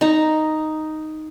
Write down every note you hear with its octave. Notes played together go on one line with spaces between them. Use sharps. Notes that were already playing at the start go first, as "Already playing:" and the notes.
D#4 A#5